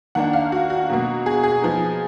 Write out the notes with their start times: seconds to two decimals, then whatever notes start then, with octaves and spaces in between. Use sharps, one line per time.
0.15 D#3 A#3 D4 F#5
0.33 F5
0.52 F#4
0.70 F#4
0.90 B2 F#3 A#3
1.26 G#4
1.43 G#4
1.62 F3 B3 D#4